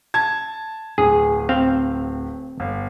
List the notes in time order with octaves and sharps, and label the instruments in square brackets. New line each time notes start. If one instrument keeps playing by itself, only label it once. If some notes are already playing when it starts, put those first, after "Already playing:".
[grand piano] A5 G#6
[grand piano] D1 [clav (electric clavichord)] G#4
[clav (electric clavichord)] C4 F5
[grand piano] G1